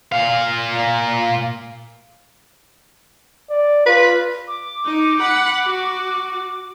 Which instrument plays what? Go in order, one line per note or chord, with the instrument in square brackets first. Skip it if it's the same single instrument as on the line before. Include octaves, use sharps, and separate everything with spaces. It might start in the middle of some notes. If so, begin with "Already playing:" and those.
[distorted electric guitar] A#2 F5
[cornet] D5
[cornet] F4 [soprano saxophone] B4
[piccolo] D6
[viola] D#4
F#5 B5
F#4